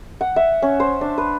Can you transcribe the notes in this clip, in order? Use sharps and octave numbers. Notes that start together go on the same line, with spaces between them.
F#5
E5
C#4
C5
D4
B4